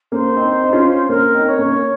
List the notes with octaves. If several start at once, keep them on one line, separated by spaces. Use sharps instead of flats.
A#3 C#4 C5
C4 D#4
D#4
C#4 F4
A#3 C#4 A#4
C4 D#4
C#5
A#3 C#4